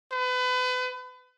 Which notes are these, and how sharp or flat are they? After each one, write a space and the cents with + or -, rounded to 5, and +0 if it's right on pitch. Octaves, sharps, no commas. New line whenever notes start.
B4 +30